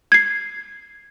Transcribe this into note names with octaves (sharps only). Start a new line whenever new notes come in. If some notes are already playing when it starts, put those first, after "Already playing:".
G#6 C7